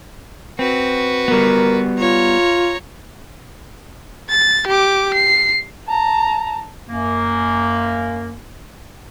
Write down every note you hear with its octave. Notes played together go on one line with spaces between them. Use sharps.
C4 F#4 B4
G3 B3 A#4
F4 C#5 A#5
A6
G4 D6
C7
A5 A#5
F#2 A#3